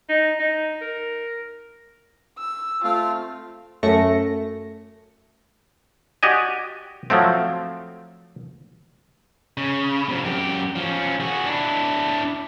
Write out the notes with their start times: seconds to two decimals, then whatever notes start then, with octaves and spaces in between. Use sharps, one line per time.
0.09 D#4
0.39 D#4
0.81 A#4
2.39 E6
2.84 A3 C4 F4 F5
3.83 F#2 A3 A#6 C#7
6.23 F#4 G4 D5 D#5 G#5
7.10 F3 F#3 A3 C4
9.58 C#3
10.09 C3 F3
10.24 F#2 G4
10.76 F3 C#4
11.20 F#4 G#4
11.46 D4 E4